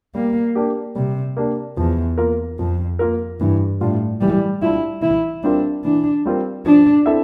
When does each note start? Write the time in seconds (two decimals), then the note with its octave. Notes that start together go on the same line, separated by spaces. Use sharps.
0.15 G3 A#3
0.55 A#3 D4 G4
0.95 C3 G3
1.37 A#3 D4 G4
1.77 E2 F3
2.18 A#3 F4 A#4
2.59 F2 F3
2.99 A#3 F4 A#4
3.40 G2 E3
3.80 A2 G3 D4 F4
4.21 E3 G3
4.62 G3 D4 E4 F4
5.02 E3 E4
5.43 G3 C4 D4 F4 A#4
5.84 E3 D4
6.25 G3 C4 F4 A#4
6.66 F3 D4
7.06 C4 E4 A4 E5